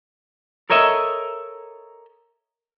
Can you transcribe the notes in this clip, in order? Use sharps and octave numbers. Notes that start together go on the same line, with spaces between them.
A4 A#4 C#5 D#5 E5